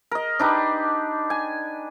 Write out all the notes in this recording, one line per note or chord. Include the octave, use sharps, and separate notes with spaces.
A#4 D#5
D4 D#4 G4 B4
G#5